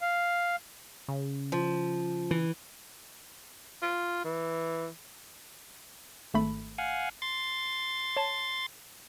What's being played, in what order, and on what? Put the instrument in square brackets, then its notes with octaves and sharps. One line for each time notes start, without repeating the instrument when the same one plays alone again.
[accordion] F5
[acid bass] C#3
[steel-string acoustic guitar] F3
[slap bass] E3
[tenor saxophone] F4
E3
[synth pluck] G#1 A3 B5
[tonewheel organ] F5 F#5 G#5
C6 A6
[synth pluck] C#5 A5